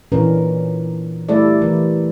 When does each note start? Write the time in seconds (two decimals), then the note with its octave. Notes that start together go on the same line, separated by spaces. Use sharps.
0.12 A#2 E3 C#4 D4 A#4
1.29 G3 A3 E4 A4 D5
1.62 E3 A#4